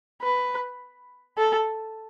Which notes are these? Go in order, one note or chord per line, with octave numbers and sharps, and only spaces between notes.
B4
A4